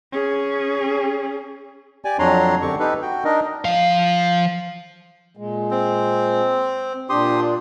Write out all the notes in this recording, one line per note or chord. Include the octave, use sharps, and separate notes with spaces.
C#4 G#4
G4 D5 G#5
F2 F#3 D4 C#5 A#5 C6
F#2 D3 C4 G4 C#6
D#4 G4 A4 B4
F#4 G5
D4 D#4 A#4 D#5
F3 F5
A#2 G#3
C4
A#2 D4 G4 C6 D#6